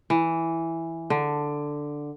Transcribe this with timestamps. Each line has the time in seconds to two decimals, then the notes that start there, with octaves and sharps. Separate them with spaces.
0.10 E3
1.10 D3